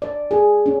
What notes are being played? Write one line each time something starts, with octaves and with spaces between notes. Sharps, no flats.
D5
G#4
C#4